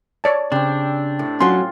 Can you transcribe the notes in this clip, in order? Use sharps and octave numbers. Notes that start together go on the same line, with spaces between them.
C#5 D5 A5
C#3 C4 D4 G4
A2
F#3 C#4 F4 G#5 C6